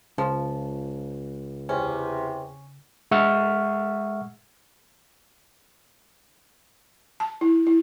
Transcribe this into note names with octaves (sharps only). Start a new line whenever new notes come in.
C#2 C#3 F3
E2 C3 C#4
G#3 E5 F#5 C#6 E6 F6
A5
E4
E4